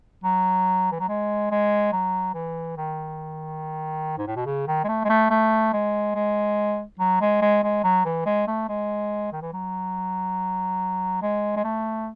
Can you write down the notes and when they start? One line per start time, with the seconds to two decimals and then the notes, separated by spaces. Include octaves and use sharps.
0.23 F#3
0.92 E3
0.99 F#3
1.08 G#3
1.51 G#3
1.92 F#3
2.34 E3
2.77 D#3
4.18 G#2
4.27 A2
4.36 B2
4.46 C#3
4.67 D#3
4.84 G#3
4.88 A3
5.04 G#3
5.09 A3
5.30 A3
5.73 G#3
6.15 G#3
6.99 F#3
7.21 G#3
7.42 G#3
7.63 G#3
7.84 F#3
8.05 E3
8.26 G#3
8.47 A3
8.69 G#3
9.32 D#3
9.42 E3
9.53 F#3
11.22 G#3
11.56 G#3
11.64 A3